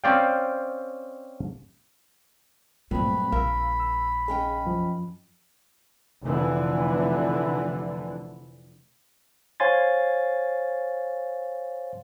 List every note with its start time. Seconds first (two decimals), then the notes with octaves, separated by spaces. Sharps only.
0.04 C4 C#4 C5 D5 F5 G5
2.91 D2 G2 A#2 F#3 G#3 A3 C4 B5
3.32 A#1 A#4 F5 A#5 E6
3.80 E6
4.28 D#2 C#4 G#4 G5
4.66 F#2 F3
6.23 F1 D3 E3
9.60 C5 C#5 F5 G#5 C6 A6